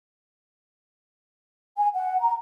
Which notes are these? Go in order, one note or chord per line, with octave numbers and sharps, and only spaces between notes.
G#5
F#5
A#5